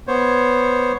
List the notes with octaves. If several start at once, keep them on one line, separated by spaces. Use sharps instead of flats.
B3 C5 C#5